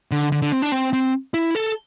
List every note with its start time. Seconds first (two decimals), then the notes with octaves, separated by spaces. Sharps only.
0.11 D3
0.32 D3
0.42 D3
0.52 C4
0.62 D4
0.72 C4
0.93 C4
1.34 E4
1.55 A4